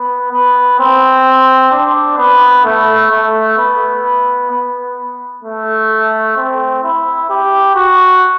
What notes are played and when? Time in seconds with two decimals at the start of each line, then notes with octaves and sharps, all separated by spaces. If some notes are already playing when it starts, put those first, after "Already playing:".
Already playing: B3
0.32 B3
0.79 C4
1.72 D4
2.18 B3
2.65 A3
3.11 A3
3.58 B3
4.51 B3
5.44 A3
6.37 C4
6.83 E4
7.30 G4
7.75 F#4